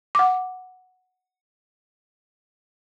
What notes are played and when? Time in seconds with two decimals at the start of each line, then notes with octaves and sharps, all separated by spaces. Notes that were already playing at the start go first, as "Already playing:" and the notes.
0.15 F#5 D6